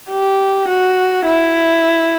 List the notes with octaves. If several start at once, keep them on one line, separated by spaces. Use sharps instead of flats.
G4
F#4
E4